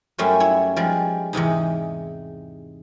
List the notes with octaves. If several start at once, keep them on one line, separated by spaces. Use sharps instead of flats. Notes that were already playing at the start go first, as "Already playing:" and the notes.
F#2 G3 A3 C#4 C5
E4 C#5
F3 G3 G#3
E2 G#2 C3 D#4